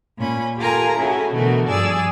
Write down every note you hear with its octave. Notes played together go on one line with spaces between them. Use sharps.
A#2 C#4 B5
F4 G4 A4 A#4 G#5 A#5
C#4 E4 F#4 G#4 A4
B2 D3 E3 A3 F#4 A#4
G2 F3 G#4 D5 G#5 E6